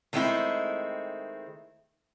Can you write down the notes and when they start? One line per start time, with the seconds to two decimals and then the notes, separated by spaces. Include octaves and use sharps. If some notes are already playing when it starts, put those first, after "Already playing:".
0.13 D#3 G#3 A3 C4 E4